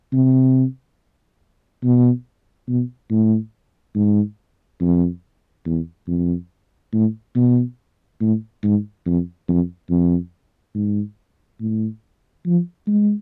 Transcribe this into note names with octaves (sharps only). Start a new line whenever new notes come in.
C3
B2
B2
A2
G#2
F2
E2
F2
A2
B2
A2
G#2
F2
F2
F2
G#2
A2
F3
G#3